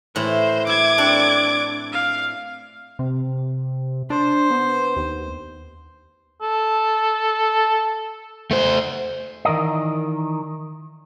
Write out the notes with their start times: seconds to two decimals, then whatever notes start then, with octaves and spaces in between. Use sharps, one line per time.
0.16 A2 E3 C5
0.67 E4 D6 G#6
0.98 C4 D4 A4
1.92 F5
2.99 C3
4.10 D4 C5
4.51 B3
4.96 D#2
6.42 A4
8.51 A3 C5
9.45 D#3 E3 A#4 D5 D#5